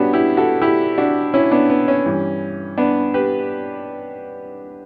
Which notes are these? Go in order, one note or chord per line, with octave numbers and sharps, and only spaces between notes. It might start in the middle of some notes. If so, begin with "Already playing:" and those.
Already playing: G2 B3 C#4 D4 F#4 G4
E4 G4
F#4 A4
E4 G4
D4 F#4
C#4 E4
B3 D4
B3
C#4
G2 E3
B3 D4
G4 B4